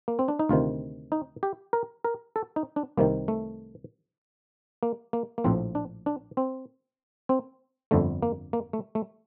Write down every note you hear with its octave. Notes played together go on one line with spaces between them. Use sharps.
A#3
C4
D4
D#4
D2 C3 D#3 F4
D#4
G4
A#4
A#4
A4
D#4
D4
C2 C3 D#3 A#3
A3
A#3
A#3
A#3
A#1 A2 F3 C4
D4
D4
C4
C4
G1 F2 D3 A3
A#3
A#3
A3
A3